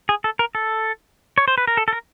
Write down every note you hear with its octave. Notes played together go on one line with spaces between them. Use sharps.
G#4
A4
A#4
A4
C#5
C5
B4
A#4
A4
A4
A#4